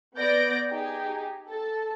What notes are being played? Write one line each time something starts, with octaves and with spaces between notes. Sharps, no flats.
B3 D5 G6 A#6 D7
D#4 G4 G#4
A4 A5